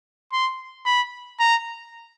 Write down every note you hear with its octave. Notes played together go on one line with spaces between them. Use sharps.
C6
B5
A#5